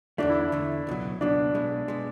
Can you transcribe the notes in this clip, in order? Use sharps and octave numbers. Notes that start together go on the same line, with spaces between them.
E2 D3 A3 D4
E4
E4
E2 D3 A3
C#2 B2 F#3
C#2 B2 F#3 D4
B1 B2 G#3
B2 G#3